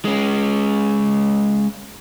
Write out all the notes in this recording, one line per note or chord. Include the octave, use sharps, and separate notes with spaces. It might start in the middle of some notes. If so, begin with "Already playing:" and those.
G#3 C#4